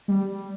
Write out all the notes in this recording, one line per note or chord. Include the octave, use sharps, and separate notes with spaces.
G3